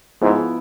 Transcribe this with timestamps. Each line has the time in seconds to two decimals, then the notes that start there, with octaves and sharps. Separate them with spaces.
0.21 G#2 F3 B3 E4